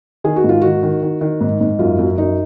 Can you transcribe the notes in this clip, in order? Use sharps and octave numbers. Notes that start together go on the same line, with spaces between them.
D#3 G#4
F#4
G#2
F4
D#3 F#4
D#3
D#3
D#3
G#2
G#2
F#2 F4
F#2
F#2 D#4